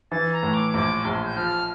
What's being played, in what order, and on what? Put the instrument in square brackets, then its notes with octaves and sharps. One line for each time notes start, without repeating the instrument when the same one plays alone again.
[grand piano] E3 [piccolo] A6
[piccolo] A#5
[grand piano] A2
[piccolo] D6
[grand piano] A#1 [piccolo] D6
[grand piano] A#1 [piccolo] C6
[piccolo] G6
[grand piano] F3 [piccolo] F6